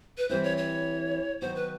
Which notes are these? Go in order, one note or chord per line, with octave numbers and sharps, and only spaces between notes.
B4
E3 G3 C4 E4 C5
C#5
C#5
D#3 F#3 B3 D#4 F#4 C5
B4